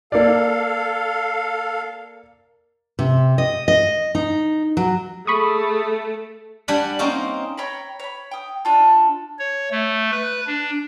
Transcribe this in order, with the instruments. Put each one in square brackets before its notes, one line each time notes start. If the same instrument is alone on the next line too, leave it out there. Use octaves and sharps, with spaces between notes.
[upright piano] A#3 D5 [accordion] A4 F5
[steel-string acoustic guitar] C3
D#5
D#5
D#4
F#3
[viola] A3 [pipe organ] G#4 [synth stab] B5 C#6 D#6
[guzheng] G3 D4 F#5 G#5 B5
A#3 C4 C#4 D#4
[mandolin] C#5 G5 A#5 B5
C#5 B5
G5 D#6
D4 F4 A4
[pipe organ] C#5
A3
B4
D4